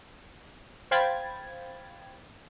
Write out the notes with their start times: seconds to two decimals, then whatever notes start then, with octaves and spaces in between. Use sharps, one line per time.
0.91 C5 F5 G5 B5 G#6 A6